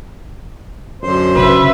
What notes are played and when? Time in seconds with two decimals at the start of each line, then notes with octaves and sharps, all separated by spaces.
1.02 F#2 D3 C5
1.36 C#3 B4 E5